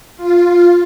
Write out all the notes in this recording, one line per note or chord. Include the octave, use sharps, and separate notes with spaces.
F4